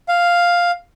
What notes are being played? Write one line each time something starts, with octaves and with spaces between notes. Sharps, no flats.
F5